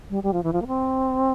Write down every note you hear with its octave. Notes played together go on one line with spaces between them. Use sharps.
G3
G3
F3
E3
F3
A#3
C4